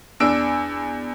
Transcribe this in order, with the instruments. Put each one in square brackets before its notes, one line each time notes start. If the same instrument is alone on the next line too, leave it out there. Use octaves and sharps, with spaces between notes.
[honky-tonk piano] E2 D4 E6 D7